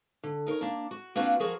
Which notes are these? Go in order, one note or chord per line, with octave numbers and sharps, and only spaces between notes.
D3
D#4 A#4 C5 C#5
A#3 D4
F#4
A#3 C4 D4 F4 F#4 B4
F3 F#4 G#4 A#4